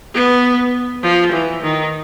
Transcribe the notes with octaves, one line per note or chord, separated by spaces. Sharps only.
B3
F3
E3
D#3